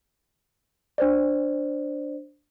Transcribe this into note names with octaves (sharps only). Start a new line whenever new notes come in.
D4 C5 D5